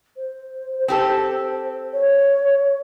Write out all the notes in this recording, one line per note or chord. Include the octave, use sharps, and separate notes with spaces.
C5
C4 G4 A4
C#5